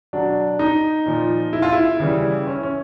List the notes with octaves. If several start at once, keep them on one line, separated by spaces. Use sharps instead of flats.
B2 F#3 D4
D#4
A#2 F3
E4
F4
E4
C#3 E3 G3
C#4
C#4